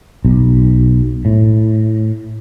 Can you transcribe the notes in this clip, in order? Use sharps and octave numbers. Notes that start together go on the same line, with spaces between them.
B1
A2